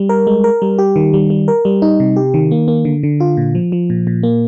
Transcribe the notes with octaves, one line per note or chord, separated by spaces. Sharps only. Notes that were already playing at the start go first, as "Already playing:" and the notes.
Already playing: G3
A#4
G#3
A#4
G3
G4
D#3
G3
G3
A#4
G3
D#4
C3
G4
D#3
A#3
A#3
D3
D3
F4
A#2
F3
F3
A#2
A#2
A#3